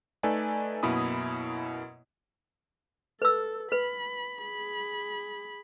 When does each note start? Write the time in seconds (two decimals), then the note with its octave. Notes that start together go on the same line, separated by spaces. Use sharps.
0.23 A3 D#4 A4 B4 D5 G#5
0.83 F#2 B2 A#3 E4 B5 D#6
3.22 A4 B4 E6
3.72 B4 B5
4.42 G#4 B5